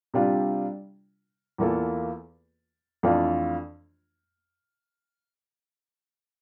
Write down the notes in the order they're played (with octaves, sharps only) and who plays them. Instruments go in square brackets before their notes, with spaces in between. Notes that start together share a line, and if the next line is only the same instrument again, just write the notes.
[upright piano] C3 G3 D4 F4
E2 E3 A#3 F4 A4
F2 E3 A3 D4 F4